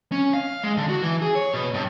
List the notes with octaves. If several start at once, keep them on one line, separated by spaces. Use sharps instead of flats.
C#4
F5
G#3
D3
F#4
E3
G#4
C#5
B2
G2